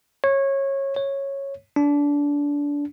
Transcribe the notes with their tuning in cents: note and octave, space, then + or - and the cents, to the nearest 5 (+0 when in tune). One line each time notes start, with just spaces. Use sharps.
C#5 -20
C#5 -10
D4 -25